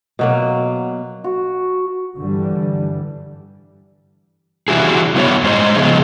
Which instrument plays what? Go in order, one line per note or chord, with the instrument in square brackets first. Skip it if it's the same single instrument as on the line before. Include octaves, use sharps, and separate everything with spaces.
[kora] B2 F#3 A#3
[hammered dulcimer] F#4
[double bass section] G2 D3 E3 G3
[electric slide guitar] E3 G3 A3 E4 F#4 G#4
G3 B3 E4 F#4 C#5
G2 G#3 C5 D#5
C#3 F3 B3 G#4 D#5